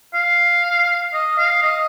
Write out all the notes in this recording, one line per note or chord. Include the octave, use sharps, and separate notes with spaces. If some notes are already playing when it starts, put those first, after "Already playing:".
F5
D#5
F5
D#5